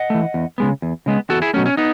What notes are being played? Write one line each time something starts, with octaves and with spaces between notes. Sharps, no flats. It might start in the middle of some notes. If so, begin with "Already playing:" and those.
Already playing: D#5 F#5
E3 A3
E2
C#3 G#3 B3
E2
C#3 G#3 B3
E2 F#4 A4
E4 G#4
B2 F#3 A3 C#4
C#4
B3 D#4